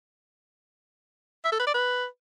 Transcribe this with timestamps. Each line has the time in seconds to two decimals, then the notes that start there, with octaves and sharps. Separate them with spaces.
1.45 E5
1.52 A4
1.59 B4
1.67 D5
1.74 B4